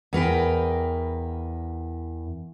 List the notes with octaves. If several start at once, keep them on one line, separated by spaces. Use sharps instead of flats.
E2 A#4 B4 G5